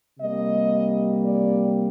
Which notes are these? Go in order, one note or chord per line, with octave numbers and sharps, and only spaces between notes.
C3 G3 A#3 D#5
D5